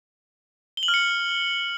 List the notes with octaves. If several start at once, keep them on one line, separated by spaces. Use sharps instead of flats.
G7
F#7
F6
C#7